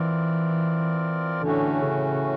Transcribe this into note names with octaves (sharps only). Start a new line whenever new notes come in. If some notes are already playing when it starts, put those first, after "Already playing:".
Already playing: E3 C4 F4 A#4 D5
A2 D3 E3 A3 C#4 F#4
C#3